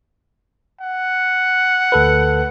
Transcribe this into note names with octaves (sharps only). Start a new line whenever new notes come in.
F#5
D2 A4 B4